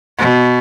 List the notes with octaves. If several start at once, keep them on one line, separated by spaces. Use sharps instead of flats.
B2